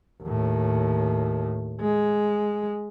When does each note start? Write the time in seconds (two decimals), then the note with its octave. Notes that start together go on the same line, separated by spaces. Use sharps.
0.23 D#2 A2
1.81 G#3